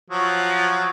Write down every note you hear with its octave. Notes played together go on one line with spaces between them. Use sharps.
F3 F#3